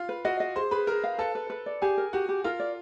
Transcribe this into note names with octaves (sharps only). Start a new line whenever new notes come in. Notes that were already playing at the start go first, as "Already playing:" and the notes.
Already playing: F4 F5
B4
F#4 D#5 F#5
D#5
G#4 C5 C6
G#4 B4 B5
G#4 A#4 A#5
F5
A4 B4 A5
B4
B4
D5
G4 G#4 G#5
A#4
F#4 G4 F#5
G4
F4 A#4 F5
D5